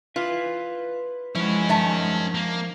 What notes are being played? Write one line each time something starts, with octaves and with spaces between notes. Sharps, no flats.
F4 B4 E5
F3 G#3 C#4 E4 F#4
D#3 E5 A5
A#3